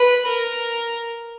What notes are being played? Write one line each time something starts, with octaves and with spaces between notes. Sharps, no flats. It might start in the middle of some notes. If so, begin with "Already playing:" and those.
Already playing: B4
A#4